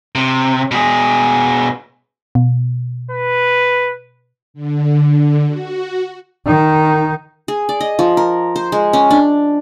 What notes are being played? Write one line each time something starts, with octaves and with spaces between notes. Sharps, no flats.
C3
B2 G#4
B2
B4
D3
F#4
D#3 D#4
G#4
D5
D#5
F3
A#4
C5
G#3
C#4
D4